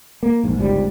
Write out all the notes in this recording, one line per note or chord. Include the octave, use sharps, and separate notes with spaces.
A#3
A#1 G#2
G1 C#2 G#2 G3